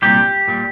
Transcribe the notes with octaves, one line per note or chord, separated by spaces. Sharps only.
C2 A#2 G3 G4
A#2 G3